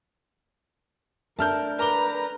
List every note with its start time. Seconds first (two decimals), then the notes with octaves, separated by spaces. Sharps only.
1.39 A3 D4 A#4 A5 F6 G6
1.79 A#4 B4 A#5 D6 G7